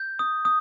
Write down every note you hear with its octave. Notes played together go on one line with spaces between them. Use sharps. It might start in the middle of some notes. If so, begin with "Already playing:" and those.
Already playing: G6
D#6
D#6